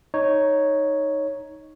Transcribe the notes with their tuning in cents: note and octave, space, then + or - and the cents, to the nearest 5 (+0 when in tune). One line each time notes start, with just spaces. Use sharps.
D#4 +0 C#5 +0